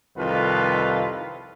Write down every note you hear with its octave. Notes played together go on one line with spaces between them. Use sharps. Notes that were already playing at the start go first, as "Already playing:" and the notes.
C2 F2 D#3 F4 A4 B4